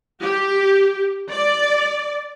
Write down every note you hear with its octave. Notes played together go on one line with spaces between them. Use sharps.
G4
D5